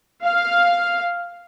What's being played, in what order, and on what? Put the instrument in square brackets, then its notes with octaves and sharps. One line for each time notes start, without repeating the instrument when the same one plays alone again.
[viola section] F5